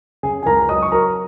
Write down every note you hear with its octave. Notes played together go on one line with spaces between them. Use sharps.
C#3 G#4 G#5
G#5
C#2 A#4 A#5
F#3 D#5 D#6
C#6
F#3 A#4 A#5